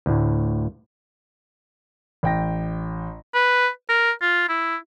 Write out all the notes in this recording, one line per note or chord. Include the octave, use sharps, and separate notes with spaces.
D2 A2
A1 G5 A#6
B4
A#4
F4
E4